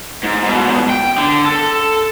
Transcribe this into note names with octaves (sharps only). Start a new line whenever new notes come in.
G#2
G#2 B2
G5
D3
A4